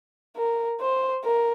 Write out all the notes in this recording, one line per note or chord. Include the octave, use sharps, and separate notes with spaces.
A#4
C5
A#4